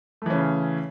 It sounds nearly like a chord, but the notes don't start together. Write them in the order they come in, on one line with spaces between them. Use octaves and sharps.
A3 E3 C#4 C#3